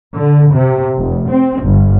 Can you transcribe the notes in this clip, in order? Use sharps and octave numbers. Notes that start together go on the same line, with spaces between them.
D3
C3
F1
C4
G1